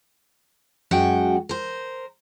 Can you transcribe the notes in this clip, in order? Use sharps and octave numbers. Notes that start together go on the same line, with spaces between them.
F#2 G#3 F#4 F#5 G5
A#4 C5